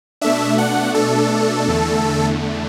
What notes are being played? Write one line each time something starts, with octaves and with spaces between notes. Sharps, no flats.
B2 A3 D4 E5
F#5
A4
E2 D3 A3